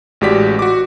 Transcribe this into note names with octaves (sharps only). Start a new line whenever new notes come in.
A1 G#3 F#4 G4 D5 B6
F#4 D6